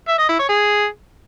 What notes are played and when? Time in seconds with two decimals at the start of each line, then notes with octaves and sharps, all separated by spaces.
0.09 E5
0.19 D#5
0.29 E4
0.39 C#5
0.49 G#4